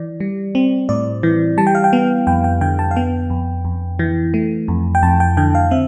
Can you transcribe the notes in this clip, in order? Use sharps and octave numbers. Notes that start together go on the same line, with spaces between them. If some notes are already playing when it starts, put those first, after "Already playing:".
Already playing: E3 D5
G3
C4
A2 D5
E3
G3 A5
G5
F5
G5
B3
F2 G5
G5
D3 G5
A5
F5
B3 G5
F2
F2
E3
A3
F2
G5
F2 A5
G5
D3 G5
F5
C4 E5